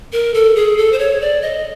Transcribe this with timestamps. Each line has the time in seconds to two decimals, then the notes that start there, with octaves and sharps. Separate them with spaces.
0.12 A#4
0.34 A4
0.56 G#4
0.77 A4
0.92 C5
0.99 C#5
1.21 D5
1.42 D#5